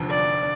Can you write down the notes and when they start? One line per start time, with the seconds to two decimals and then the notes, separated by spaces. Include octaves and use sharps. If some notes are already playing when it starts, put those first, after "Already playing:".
Already playing: F1 D#2 D3 F3
0.11 D5